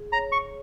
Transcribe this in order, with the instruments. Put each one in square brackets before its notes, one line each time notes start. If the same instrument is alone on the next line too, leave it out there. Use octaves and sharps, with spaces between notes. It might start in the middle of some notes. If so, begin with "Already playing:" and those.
Already playing: [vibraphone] G#4
[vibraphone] C#5 [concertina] A#5
[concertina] C#6